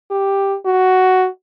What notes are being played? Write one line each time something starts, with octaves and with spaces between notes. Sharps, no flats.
G4
F#4